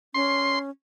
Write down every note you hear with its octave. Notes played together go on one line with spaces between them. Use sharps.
C#4 C6